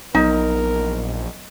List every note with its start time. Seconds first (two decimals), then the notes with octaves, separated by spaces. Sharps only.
0.15 A#1 F#3 B3 D#4 A#4 D#5